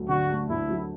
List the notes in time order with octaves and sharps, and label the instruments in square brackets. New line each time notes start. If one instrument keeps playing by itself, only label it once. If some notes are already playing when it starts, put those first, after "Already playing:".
Already playing: [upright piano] D2 F#3 A3
[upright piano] D3 [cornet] F#4
[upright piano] A3
[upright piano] D2 [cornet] E4
[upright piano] F#3